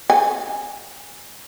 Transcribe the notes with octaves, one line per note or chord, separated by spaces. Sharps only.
G#5